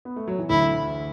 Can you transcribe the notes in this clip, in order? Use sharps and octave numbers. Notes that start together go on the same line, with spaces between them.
B3
A3
F#3
E3
D2 D3 E4